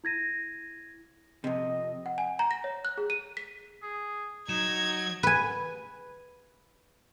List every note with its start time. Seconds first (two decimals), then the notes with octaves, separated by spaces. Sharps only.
0.04 E4 G#6 A#6 D#7
1.44 F2 C3 D#5
2.06 F#5
2.18 G#5
2.39 A#5
2.51 A#6
2.64 C#5
2.85 F#6
2.98 G#4
3.10 D#7
3.37 B6
3.83 G#4
4.49 F#3 D#4 G#6 E7
5.23 B4 G#5